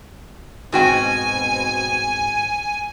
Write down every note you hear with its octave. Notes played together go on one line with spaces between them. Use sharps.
G#2 B2 C4 F#4 G5 G#5